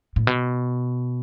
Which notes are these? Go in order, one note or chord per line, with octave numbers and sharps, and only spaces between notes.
A2
B2